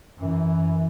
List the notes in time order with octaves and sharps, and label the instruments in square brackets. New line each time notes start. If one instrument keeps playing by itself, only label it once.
[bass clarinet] F#2 [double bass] E3